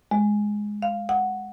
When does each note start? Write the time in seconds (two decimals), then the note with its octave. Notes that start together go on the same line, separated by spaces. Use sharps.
0.11 G#3
0.82 F5
1.09 F#5